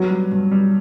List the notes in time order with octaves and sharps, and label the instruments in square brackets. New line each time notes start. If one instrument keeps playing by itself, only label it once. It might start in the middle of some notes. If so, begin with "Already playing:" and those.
Already playing: [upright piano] F#3 [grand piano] B3
[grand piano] G3
G2
G3